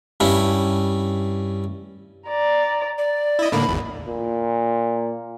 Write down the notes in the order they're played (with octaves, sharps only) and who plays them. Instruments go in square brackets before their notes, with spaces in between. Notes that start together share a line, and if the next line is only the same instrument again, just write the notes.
[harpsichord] G2 C#4 E4
[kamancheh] D5 A#5
[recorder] D5
[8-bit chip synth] E4 D#5
[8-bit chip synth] A2 D3 A#3 [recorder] B5
[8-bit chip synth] G#1 E2
[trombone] A#2